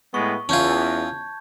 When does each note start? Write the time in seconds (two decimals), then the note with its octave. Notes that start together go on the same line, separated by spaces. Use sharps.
0.14 A2 G#3 B3 C#6
0.49 E2 C#4 F4 A5 G6 G#6